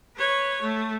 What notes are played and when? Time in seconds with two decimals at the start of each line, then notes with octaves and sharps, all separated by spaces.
0.16 B4 C#5
0.62 A3